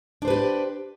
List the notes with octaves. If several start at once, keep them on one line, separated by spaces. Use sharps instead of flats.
D4 G4 B4 C5